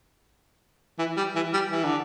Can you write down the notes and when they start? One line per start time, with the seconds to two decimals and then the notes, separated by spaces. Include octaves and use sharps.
0.99 E3
1.17 G3
1.36 E3
1.53 G3
1.71 E3
1.84 D3